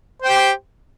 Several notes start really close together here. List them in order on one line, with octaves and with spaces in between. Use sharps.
C5 G5 G4